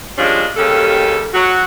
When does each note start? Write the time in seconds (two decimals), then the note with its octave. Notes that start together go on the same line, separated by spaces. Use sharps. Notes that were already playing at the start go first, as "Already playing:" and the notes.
0.18 F3 G3 G#3 A#3 C#4 D4
0.57 D#2 C#3 G3 C#4 A4
1.34 F#3 F#4